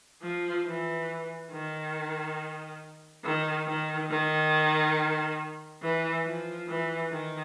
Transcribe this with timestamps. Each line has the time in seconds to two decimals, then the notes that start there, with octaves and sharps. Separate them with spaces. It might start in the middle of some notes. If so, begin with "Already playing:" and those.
0.22 F3
0.66 E3
1.51 D#3
3.24 D#3
3.67 D#3
4.10 D#3
5.82 E3
6.25 F3
6.68 E3
7.11 D#3